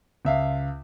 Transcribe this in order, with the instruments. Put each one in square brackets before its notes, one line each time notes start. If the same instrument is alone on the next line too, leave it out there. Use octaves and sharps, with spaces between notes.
[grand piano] C#2 E5 F5